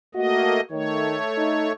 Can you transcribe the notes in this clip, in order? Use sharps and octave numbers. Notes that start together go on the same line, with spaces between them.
A3 A#3 F#4 D#5
D#3 A3 C#5
D#4